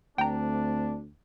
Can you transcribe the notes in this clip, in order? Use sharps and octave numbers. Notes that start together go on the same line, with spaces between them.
D2 A3 C4 D4 G5 A#5